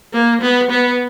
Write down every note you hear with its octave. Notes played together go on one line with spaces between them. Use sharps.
A#3
B3
B3